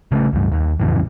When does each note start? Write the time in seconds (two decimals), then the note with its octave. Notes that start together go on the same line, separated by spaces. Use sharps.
0.12 C#3 G#3 A3
0.33 C#2 G2
0.52 D#2
0.80 A1 F2 C#3 E3